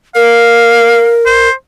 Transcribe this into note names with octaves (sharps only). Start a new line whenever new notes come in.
A#4 F5
C5